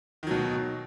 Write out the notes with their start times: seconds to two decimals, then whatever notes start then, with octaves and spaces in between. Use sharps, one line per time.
0.23 D#3
0.27 F#3
0.31 B2